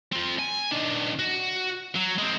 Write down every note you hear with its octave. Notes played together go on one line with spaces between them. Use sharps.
C4 F4
G#5
D#3 D4
F#4
F#3
G#3 C4